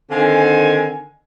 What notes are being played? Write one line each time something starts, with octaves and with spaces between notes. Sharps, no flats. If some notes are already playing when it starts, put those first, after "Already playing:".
D3 D#3 C4 F5 G#5